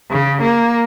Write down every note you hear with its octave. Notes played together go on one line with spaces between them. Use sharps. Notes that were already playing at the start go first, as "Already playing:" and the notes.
C#3
A#3